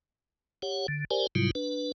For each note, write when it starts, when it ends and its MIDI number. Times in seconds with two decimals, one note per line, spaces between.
0.62 0.87 67
0.62 0.87 73
0.62 0.87 78
0.88 1.05 50
1.11 1.27 67
1.11 1.27 70
1.11 1.27 72
1.11 1.27 74
1.11 1.27 80
1.35 1.51 44
1.35 1.51 48
1.35 1.51 54
1.35 1.51 55
1.35 1.51 64
1.35 1.51 65
1.55 1.92 62
1.55 1.92 71